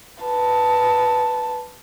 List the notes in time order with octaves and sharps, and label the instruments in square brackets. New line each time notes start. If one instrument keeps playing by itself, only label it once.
[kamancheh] B4 A5